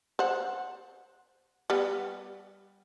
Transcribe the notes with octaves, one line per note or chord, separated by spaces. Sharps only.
C5 F#5
G3 B3